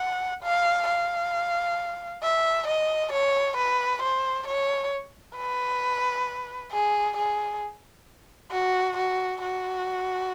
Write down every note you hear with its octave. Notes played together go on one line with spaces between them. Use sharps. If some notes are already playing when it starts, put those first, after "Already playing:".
Already playing: F#5
F5
F5
E5
D#5
C#5
B4
C5
C#5
B4
G#4
G#4
F#4
F#4
F#4